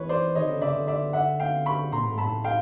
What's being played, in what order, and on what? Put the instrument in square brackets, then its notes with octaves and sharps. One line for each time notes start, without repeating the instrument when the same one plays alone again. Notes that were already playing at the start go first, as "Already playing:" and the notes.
Already playing: [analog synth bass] E3 [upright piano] B4 C#5
[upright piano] C5 D5
[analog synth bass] D#3 [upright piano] C#5 D#5
[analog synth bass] D3
[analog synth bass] C#3 [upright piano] D5 E5
[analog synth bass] D3
[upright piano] D5 E5
E5 F#5
F5 G5
B5 C#6
[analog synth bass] A#2 [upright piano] A#5 C6
[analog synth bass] A2
[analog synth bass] G#2 [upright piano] A5 B5
[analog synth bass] A2
[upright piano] F5 G5